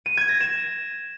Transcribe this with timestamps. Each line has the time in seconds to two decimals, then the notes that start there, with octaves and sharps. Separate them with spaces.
0.06 D#7
0.17 G#6
0.29 A#6
0.40 E7